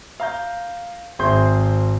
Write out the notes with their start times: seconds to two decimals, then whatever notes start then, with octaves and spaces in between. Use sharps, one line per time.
0.20 F5 A#5 G6
1.19 G#1 C4 G#4 E5 C6 G6